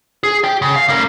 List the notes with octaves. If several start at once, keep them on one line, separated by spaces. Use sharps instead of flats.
G#4
G4 G5
C#3
F5
G3 A#4